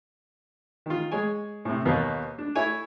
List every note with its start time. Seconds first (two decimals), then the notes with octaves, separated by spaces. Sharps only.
0.86 D#3 F4
1.11 G#3 G#4 C#5 G#5
1.65 A2 C3
1.85 D#2 B2 A#3
2.38 D4
2.55 A3 E4 C#5 G#5